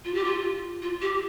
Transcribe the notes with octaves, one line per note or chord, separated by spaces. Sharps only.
F4
G4
F4
F4
G4